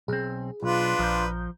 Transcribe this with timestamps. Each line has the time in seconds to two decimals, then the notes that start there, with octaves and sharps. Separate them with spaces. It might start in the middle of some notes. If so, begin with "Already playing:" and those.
0.08 B1 C4 G#4
0.62 B1 D4 F4 B4
0.99 A#1 F3 A#5 G6